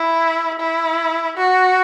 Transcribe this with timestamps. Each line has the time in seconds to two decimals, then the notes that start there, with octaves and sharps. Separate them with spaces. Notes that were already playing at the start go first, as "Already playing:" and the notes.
Already playing: E4
0.60 E4
1.37 F#4